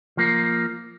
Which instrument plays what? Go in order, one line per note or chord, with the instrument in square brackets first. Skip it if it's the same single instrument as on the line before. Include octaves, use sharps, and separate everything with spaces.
[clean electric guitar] F3 A#3